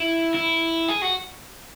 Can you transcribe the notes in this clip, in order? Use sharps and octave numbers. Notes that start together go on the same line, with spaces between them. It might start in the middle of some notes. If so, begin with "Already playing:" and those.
Already playing: E4
E4
G#4
F#4